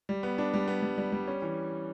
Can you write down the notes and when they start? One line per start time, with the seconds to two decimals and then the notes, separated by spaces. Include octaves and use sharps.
0.09 G3
0.23 B3
0.38 D4
0.54 G3
0.68 B3
0.82 G3
0.98 G3
1.12 G3
1.27 C#4
1.42 E3